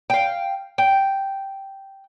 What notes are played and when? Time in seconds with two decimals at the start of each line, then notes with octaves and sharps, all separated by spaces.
0.10 F5 G5
0.78 G5